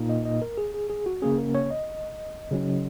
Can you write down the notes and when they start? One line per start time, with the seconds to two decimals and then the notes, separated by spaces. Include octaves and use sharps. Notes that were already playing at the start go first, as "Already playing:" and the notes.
Already playing: A#2 A#3 D#4
0.09 D#5
0.25 D#5
0.42 A#4
0.58 G#4
0.74 G#4
0.90 G#4
1.06 F#4
1.22 C#3 A#3 C#4 G#4
1.38 A#4
1.55 C#5
1.71 D#5
2.51 C#3 F#3 C#4